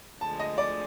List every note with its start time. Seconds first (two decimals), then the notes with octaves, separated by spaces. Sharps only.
0.21 D2 D3 F3 G#3 A5
0.40 D#5
0.58 D5